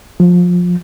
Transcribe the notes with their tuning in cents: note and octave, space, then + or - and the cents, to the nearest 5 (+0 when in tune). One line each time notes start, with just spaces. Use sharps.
F3 +25